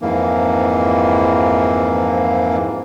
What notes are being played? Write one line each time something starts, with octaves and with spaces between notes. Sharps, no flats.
F2 G#2 E3 A#3